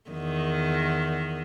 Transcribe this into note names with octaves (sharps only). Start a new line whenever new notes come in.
E2 D#3